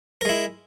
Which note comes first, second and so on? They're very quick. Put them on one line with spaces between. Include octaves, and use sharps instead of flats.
A#4 G#3 E4